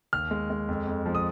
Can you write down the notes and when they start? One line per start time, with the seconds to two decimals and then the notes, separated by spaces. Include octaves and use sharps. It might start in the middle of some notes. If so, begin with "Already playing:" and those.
0.13 D#2 F6
0.31 G#3
0.50 G#3
0.69 F2
0.87 F2
1.06 F3
1.15 D#6